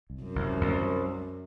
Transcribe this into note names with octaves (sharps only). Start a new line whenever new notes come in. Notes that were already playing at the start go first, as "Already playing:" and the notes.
C2
F#2
C2
C2